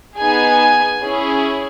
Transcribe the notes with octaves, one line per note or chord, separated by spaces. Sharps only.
B3 D#4 G#4 G#5
C#4 E4 G#4